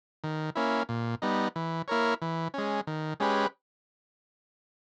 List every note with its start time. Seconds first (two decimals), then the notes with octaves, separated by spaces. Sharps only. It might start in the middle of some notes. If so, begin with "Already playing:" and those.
0.24 D#3
0.55 A#3 C#4 E4
0.89 A#2
1.22 G3 B3 D#4
1.56 E3
1.88 A#3 E4 A#4 C#5
2.22 E3
2.54 G#3 C#4
2.87 D#3
3.20 G#3 C#4 G4 B4